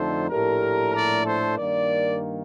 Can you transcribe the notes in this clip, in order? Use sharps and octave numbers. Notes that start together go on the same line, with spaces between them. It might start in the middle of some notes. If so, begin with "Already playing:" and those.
Already playing: F2 D3 A3 D#4 A4 C5
A#1 A2 A3 D4 G4 A#4
A#4 D5
A4 C5
G2 D#3 A#3 A#4 D5